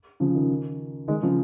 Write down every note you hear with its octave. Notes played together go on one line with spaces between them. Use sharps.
C#3 F3
D#3
D#3 G#3
C#3 F3